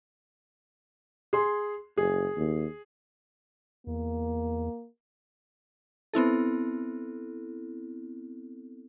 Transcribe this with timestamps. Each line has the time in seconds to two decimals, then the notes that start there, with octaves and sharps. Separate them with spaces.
1.33 G#4 C6
1.98 F#1 G#4
2.36 D#2
3.87 E2 A#3
6.13 B3 C4 E4 A4